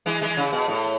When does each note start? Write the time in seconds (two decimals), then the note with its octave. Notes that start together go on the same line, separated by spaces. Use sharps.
0.06 E3 G#3
0.22 E3 G#3
0.37 C#3
0.53 B2
0.68 A2